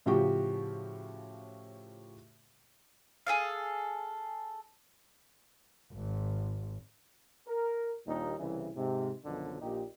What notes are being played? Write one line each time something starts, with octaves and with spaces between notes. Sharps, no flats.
A2 C#3 F3 F#4 G4
G#4 A4 F5
G#1
A#4
D#2 A#2 G3 D4 D#4
C2 C#3 E3
G#2 C3
B1 F#2 D3 D#3 F3
A#1 A#2 D#4 G4